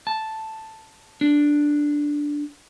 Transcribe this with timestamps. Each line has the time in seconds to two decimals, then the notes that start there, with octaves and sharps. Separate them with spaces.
0.07 A5
1.21 D4